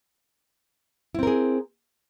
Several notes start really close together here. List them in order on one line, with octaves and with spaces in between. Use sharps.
E4 C4 A#4 G#4